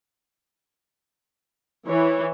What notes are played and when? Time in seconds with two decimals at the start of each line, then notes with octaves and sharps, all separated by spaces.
1.87 E3 C#5